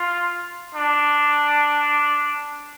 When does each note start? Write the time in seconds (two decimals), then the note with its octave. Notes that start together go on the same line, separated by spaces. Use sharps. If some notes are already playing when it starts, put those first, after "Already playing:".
Already playing: F4
0.75 D4